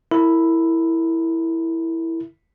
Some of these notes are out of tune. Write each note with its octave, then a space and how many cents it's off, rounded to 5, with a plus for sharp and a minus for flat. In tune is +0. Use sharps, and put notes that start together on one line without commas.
E4 +0 A#4 -25